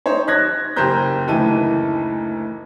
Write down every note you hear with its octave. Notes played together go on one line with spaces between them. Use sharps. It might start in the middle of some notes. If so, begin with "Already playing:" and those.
D#4 C5 C#5
F#6 G#6 A#6
F#1 G4 C5 A#5 G6
F#1 D2 E3 D#4 A5 D#7